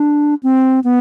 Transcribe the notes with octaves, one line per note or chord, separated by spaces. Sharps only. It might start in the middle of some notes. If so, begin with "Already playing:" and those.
Already playing: D4
C4
B3